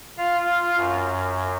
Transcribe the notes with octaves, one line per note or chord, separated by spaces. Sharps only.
F4 F5
F#2